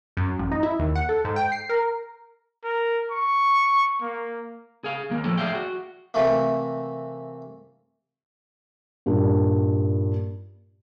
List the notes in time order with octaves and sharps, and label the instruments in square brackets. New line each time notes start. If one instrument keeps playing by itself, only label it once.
[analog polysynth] F#2
A1
D#4
E4
D#2
F#5
A4
G#2
G5
C7
A#4
[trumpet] A#4
C#6
A#3
[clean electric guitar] G#4 F5
D#2 A#3
A2 F3 A4
G#4 A#4 D5 E5 F5 G5
F#4
[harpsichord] C3 E3 A3 A#3
[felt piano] G2 A#2